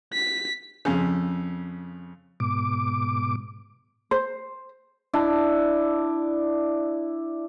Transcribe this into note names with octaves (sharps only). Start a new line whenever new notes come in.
B6
F2 C#3
G#2 B2 D6
C5
D4 E4